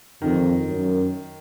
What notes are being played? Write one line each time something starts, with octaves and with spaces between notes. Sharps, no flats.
F2 D#3
F#2